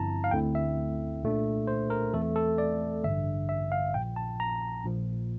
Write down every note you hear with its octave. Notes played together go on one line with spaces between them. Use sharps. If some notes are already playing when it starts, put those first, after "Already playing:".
Already playing: G1 G2 F3 C4 E4 A5 A#5
F5
D2 D3 A3 C4 E4 G5
E5
C2 A#2 A3 D4
C5
A#4
E2 E3 A3 C4 A4
A4
D5
A1 G2 D3 E5
E5
F5
A#1 A#2 F3 G5
A5
A#5
A#1 A#2 F3